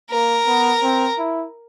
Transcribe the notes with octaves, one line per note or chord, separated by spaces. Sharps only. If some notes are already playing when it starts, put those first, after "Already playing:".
A#3 A#4
B3
C4
E4